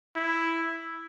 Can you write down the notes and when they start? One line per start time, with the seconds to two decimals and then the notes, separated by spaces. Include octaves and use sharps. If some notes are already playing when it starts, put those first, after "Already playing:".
0.16 E4